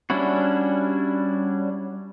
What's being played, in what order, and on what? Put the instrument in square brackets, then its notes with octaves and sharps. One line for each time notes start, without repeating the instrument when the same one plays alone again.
[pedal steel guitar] G3 C#4 D4 E4 F#4